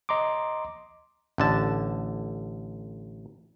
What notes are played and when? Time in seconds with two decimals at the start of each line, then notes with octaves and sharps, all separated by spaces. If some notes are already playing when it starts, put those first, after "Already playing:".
0.09 D#5 A#5 C6 D6
1.38 A1 D3 A5